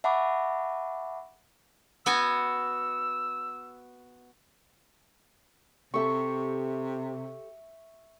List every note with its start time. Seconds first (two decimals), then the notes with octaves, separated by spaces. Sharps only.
0.04 E5 F#5 A5 B5 C#6 D6
2.06 B3 F#4 G#5 E6
5.94 C3 G4 A4 E5 A5 C#6